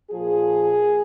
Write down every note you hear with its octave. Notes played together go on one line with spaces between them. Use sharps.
A#2 F3 G#4